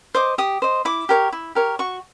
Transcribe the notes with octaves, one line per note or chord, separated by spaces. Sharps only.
C5 D#5 D6
G4 D#6
C5 D#5
E4 D6
G4 A#4 C#5
E4
G4 A#4 C#5
F#4 C#6